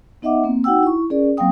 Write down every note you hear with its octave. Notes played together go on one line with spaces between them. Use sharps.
B3 D#4 D#5 E5 F#5 D6
A#3 C4
D#4 F#4 F#5 G5 E6
E4 C#6
C#4 G#4 A#4 D5
F#3 A#3 C4 F5 G5 D#6